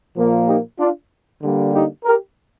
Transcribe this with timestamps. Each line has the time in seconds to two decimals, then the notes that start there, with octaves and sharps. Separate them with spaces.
0.15 A#2 F3 A#3
0.46 D#4 G4
0.78 D4 F4
1.41 D3 G3 A#3
1.72 D#4 G4
2.04 G4 A#4